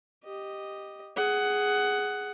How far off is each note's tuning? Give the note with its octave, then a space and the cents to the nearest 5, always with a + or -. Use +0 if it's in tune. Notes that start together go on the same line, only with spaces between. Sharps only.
G4 +0 D#5 +0
G#4 +0 F#5 +15